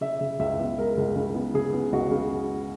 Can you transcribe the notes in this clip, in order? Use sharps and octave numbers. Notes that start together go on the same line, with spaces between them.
C#3 E5
C#3
C#2 E5
B3
G#3 A#4
C#2
C#3
B3
C#3 G#4
B3
C#2 F#4
C#3